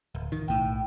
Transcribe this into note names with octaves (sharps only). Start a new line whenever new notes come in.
D1
D#3
B1 A2 G5